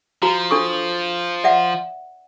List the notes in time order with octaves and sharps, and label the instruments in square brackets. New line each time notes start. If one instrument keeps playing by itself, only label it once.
[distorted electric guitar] F3 [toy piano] F#4 A#5
[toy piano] D4 A4 C#6
D5 E5 F#5